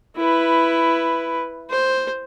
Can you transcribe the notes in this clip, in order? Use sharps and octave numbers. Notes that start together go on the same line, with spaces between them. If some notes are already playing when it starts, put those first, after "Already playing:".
E4 B4
C5